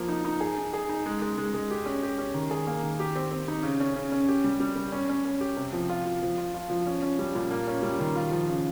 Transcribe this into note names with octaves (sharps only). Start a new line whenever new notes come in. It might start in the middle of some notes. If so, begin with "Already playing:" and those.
Already playing: F3 A#3
D#4
D#4
G#4
D#4
G#4
D#4
G#3
G#3
G#3
G#3
G4
C#4
G4
C#4
D#3
G#4
A#3
D#3
G4
C4
C4
D#4
C#3
C#4
C#3
C#4
G4
G3
G3
G3
C#4
C#4
C#4
G4
C3
F3
F4
F4
F3
F4
F4
F3
C#4
C#4
G3
A#2
A#3
C#4
G3
D#3
F4
F3
C#3